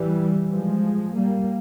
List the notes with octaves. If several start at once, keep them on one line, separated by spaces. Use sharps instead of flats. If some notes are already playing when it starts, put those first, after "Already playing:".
Already playing: E3 G3
F3 G#3
G3 A#3